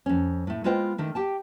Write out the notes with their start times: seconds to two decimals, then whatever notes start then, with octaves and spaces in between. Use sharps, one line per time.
0.06 F2 C#4
0.47 A2 A3
0.64 G#3 B3 F4 C5 D#5 G5
0.98 D3 D#3 A3
1.15 G4 G5 A5